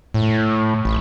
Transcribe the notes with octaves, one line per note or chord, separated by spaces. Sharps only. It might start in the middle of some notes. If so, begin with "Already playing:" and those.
A2
A1